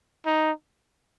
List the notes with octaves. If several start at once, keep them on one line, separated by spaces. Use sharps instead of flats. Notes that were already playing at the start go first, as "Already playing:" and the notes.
D#4